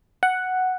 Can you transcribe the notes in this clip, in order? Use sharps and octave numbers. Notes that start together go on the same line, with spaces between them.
F#5